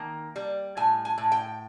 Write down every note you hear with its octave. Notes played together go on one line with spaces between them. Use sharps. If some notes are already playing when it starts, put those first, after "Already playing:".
Already playing: D#3 A#3 G5
G3
A2 G#5
G#5
A2
G5